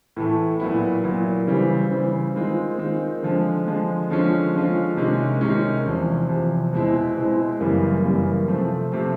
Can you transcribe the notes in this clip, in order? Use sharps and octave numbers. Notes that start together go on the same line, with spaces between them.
A2 E3 A3
A#2 F#3 B3 E4
A#2 F#3 B3 E4
C#3 E3 G3 C4
C#3 E3 G3 C4
D#3 G#3 C4 F4
D#3 G#3 C4 F4
D3 F3 G#3
D3 F3 G#3
D3 F3 G#3 C#4 F4
D3 F3 G#3 C#4 F4
C3 D#3 G#3 C#4
C3 D#3 G#3 C#4
E2 C3 F3
E2 C3 F3
B2 G#3 C4 E4
B2 G#3 C4 E4
F#2 C#3 E3 G3 A#3
F#2 C#3 E3 G3 A#3
C3 F3 A3 C4
C3 F3 A3 C4